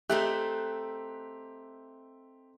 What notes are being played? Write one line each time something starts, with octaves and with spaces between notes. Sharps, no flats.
A3 C4 D#4 G4 E5 F#6